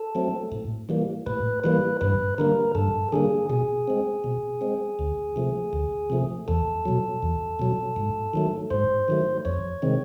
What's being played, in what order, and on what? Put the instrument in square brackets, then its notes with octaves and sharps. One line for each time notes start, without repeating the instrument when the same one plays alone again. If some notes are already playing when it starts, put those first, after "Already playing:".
Already playing: [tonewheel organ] A4
F#3 A3 C4
A2
E3 G3 A#3
A2 B4
E3 G3 A#3 B4
G2 B4
D3 G3 A#3 A#4
G2 A4
D3 G3 A#3 G#4
B2 G#4
G#3 C4
B2
G#3 C4
D2
C3 F3 A3
D2
C3 F3 A3
E2 A4
B2 F#3
E2
B2 F#3
G#2
D#3 F#3 A3
G#2 C5
D#3 F#3 A3
F2 C#5
C3 D#3 G#3 C4